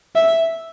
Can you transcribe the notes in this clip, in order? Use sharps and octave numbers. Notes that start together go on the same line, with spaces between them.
E5